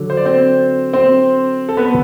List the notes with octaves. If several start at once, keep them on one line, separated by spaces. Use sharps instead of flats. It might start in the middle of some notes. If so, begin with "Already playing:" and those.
Already playing: D3 F#3
C5
D5
C4 C5
C4 C5
A4
B3 B4